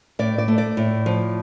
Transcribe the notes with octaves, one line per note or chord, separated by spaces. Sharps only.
A2 D5
D5
A3
D5
A2
F3